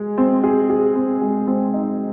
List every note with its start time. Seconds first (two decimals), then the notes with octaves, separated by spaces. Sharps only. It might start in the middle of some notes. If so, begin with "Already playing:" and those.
Already playing: G#3 G#4
0.18 C4
0.44 G#4
0.70 G#4
0.96 C4
1.22 G#3
1.47 C4
1.74 D#4